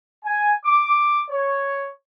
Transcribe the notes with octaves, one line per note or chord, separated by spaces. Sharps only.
G#5
D6
C#5